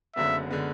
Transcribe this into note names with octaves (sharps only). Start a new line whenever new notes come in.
F#1 F#2 D3 G#3 B3 E5
D3 G#3 B3